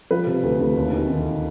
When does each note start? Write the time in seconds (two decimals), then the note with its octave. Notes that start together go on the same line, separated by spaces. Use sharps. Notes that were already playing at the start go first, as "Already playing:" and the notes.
0.11 F3 B4
0.27 C3
0.44 D2
0.60 D2
0.77 D#2
0.93 D#3
1.09 D#3